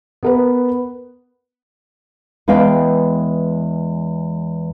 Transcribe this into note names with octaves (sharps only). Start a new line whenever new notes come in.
B3 A#4 B4
E2 G#3 B4 F5 G5